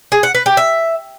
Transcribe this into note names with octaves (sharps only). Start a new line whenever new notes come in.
G#4
F#5
B4
G4
E5